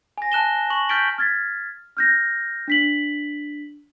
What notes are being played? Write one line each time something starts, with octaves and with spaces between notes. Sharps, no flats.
G#5 A#6
A5 F#6 E7 G7
C#6 F#7
F6 G6 A6 B6 D7 G7
F6 G#6 A6 B6
F6 G6 A#6
D4 B6 F#7